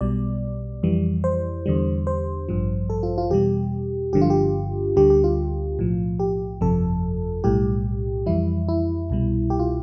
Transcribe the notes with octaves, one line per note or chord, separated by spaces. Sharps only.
B1 B2 G3 D5
F2 E3 G3
C5
E2 D3 G3
C5
A1 G2 F3
A4
F4
F4
E2 B2 G3 G4
G1 G2 D3 F3 G4
F4
G4
D2 D3 G3 G4
G4
F4
B1 A2 F3
G4
G1 F2 C3 F3 A4
B1 A2 G3 G4
F2 E3 G3 E4
E4
C2 B2 G3
G4
F4